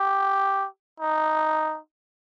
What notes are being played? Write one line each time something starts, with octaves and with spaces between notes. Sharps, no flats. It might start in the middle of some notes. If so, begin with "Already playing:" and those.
Already playing: G4
D#4